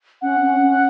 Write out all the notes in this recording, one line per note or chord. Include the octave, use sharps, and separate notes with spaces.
C#4 F#5
C#4
C#4